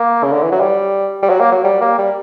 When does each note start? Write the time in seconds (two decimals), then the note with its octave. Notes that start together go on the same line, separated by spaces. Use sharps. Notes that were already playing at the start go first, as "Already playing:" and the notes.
Already playing: A#3
0.23 C#3
0.33 D3
0.42 E3
0.52 F#3
0.60 G3
1.23 G3
1.29 F#3
1.40 A#3
1.52 F#3
1.64 G3
1.81 A#3
1.98 G3